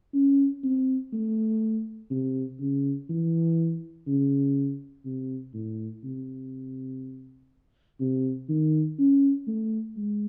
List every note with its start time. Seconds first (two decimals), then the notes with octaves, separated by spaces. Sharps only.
0.14 C#4
0.64 C4
1.13 A3
2.11 C3
2.60 C#3
3.10 E3
4.07 C#3
5.05 C3
5.54 A2
6.04 C3
8.00 C3
8.49 D#3
8.99 C#4
9.47 A3
9.97 G#3